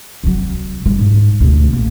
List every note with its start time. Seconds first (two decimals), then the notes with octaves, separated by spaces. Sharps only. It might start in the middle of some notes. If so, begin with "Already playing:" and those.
0.24 C3 F#3
0.86 G3 E4
0.99 G#2
1.40 D2 C3
1.73 A1 A#3